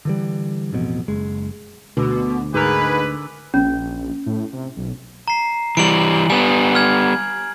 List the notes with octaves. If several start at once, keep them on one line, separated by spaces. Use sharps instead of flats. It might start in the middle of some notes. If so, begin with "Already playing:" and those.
D3 E3 G3
A1 F2 B2
F#1 G#3
D2 B2 D3
G#2 D3 G#4 A#4 B4
A#1 C#4
A2
C3
B1
A#5 C7
E3 G3 D7 F#7
G3 B3 G#5
F6 G#6